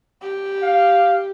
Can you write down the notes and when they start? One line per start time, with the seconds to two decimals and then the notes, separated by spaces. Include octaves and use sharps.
0.22 G4
0.63 F5